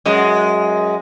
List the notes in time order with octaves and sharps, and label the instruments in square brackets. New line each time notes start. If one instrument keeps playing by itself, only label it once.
[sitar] F#2 G#3